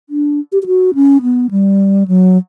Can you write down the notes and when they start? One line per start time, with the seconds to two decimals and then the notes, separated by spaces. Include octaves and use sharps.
0.09 D4
0.52 G4
0.62 G4
0.66 F#4
0.95 C#4
1.22 B3
1.51 G3
2.08 F#3